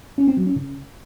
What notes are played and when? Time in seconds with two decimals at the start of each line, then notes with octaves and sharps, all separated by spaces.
0.18 C#4
0.27 C4
0.37 F#3
0.47 C#4
0.56 C#3